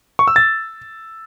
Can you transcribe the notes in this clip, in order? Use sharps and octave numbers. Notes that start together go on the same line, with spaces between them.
C#6
E6
A6